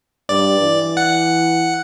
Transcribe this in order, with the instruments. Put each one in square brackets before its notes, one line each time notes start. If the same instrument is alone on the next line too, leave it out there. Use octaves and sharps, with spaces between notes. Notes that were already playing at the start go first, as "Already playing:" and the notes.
[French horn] G2 [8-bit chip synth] D5
[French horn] E3
[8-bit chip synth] F#5